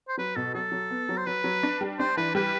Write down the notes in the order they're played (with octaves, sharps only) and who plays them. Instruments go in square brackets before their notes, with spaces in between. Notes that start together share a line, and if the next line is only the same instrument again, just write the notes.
[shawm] C5
[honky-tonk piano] F#3 [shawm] B4
[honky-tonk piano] B2 [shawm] A4
[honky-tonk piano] F#3 [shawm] A4
[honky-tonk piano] F#3
B3
F#3
[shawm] C5
[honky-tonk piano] F#3 [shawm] B4
[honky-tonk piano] F#3
D4
G3
[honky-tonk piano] D4 [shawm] C5
[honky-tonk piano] E3 [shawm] B4
[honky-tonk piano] G3 [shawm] B4